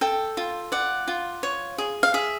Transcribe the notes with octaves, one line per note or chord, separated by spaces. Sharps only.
A4 G5
F4
D5 F#5
F4
C#5
G#4
F5
G#4 E5